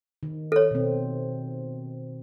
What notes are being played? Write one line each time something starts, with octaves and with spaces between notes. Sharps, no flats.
D#3
A4 C#5
B2 C4